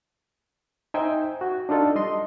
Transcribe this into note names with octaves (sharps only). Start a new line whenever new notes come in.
D#4 C5 E5 G5 G#5
F#4
D4 D#4 F4 A4
G3 D#5 C6